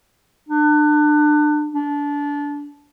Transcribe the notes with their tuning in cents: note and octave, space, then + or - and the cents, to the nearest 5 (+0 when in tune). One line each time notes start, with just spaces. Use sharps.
D4 +30
D4 -25